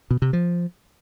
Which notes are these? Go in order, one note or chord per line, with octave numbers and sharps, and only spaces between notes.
B2
C3
F3